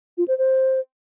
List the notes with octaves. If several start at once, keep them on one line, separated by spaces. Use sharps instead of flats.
F4
C5
C5